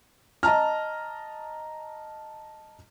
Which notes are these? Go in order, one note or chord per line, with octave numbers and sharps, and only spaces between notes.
D#5 A5 A#5 F6